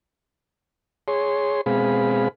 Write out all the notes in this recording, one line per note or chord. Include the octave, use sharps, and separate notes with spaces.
G#4 C#5 C6
B2 G#3 C4 G#4 F5 B5